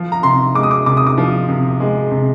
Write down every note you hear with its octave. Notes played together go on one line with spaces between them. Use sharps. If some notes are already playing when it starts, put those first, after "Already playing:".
Already playing: F3
A#5
C3 C6
G#3 D6
D#6
D6
C3 D6
D#6
D6
F3
C3
G#3
C3